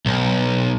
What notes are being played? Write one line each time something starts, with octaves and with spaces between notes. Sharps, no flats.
B1